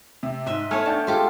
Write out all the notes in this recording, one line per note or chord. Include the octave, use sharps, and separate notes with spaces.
C3
G#2 D#5 E5
A3 B3 C#5 G#5 F6 G#6
D4 G5 A5 G6
G#3 F4 G4 A4